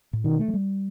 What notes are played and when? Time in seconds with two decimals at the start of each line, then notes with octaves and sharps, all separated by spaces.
0.13 A2
0.24 B2 D#3
0.39 A3
0.48 F#3
0.54 G3